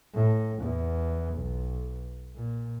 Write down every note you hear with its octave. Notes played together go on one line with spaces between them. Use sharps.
A2
E2
B1
A#2